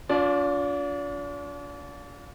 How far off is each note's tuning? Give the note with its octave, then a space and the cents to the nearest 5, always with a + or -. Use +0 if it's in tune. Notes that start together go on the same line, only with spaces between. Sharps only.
D4 -40 F4 +30 D5 +0